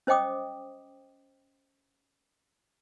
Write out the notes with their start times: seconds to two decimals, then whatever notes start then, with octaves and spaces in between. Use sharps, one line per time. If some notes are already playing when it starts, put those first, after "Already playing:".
0.07 C#4 C5 D#5 G5 D6 D#6